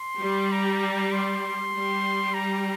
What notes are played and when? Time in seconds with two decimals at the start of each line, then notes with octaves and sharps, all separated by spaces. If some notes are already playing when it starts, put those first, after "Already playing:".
Already playing: C6
0.21 G3
0.52 A#5
1.12 C6
1.73 G3
2.34 A#5